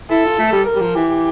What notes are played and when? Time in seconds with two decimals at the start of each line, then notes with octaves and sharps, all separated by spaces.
0.10 E4 A4
0.25 F4
0.39 A3
0.52 G3
0.67 A#4
0.76 G3
0.81 F3
0.95 E3 G4